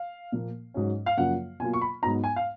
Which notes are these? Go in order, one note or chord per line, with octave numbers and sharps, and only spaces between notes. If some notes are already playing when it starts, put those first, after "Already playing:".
Already playing: F5
A#2 F3 A#3
G#2 F#3 C#4
F5
F#2 C#3 F3 A#3 F4 F#5
B2 F#3 A#3 F4 G#5
C#6
B5
G#2 F#3 B3 D#4 A#5
G#5
F5